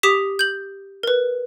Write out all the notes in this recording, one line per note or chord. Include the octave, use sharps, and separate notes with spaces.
G4 D6 D#6 B6 E7
G6 F#7
A#4 B4